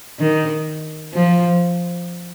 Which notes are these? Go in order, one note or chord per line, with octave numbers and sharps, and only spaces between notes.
D#3
F3